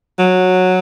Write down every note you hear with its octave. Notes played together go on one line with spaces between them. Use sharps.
F#3